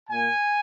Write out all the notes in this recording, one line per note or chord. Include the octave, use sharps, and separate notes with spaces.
A#2 A#3 G#5